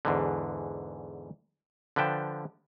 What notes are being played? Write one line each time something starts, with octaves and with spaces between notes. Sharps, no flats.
E2 G#2 D3
D3 F3 B4 G5 A5